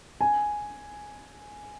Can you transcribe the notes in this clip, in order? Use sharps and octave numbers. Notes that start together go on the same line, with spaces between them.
G#5